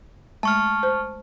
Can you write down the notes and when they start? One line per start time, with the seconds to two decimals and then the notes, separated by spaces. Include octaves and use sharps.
0.43 G#3 A3 A5 C#6 F6
0.83 C5